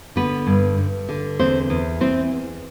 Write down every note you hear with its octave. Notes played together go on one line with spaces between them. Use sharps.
D3 B3 B4
G2
G2
D3
E2 C4 C5
E2
E3 C4 C5
E2